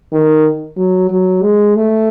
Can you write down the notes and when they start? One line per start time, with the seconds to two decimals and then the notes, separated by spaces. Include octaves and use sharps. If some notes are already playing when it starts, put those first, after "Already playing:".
0.12 D#3
0.77 F#3
1.10 F#3
1.42 G#3
1.75 A3